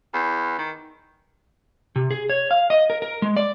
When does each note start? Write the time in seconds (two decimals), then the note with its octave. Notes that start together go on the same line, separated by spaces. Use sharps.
0.14 E2
0.58 D#3
1.96 C3
2.11 G#4
2.30 C#5
2.51 F5
2.70 D#5
2.90 A#4
3.02 A#4
3.22 G#3
3.37 D5